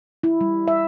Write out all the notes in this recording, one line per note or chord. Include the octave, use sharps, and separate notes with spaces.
E4
G3
E5